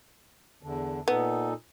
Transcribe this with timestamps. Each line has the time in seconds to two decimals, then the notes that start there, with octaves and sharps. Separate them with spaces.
0.63 E2 D3
1.08 A#2 B3 D#4 A4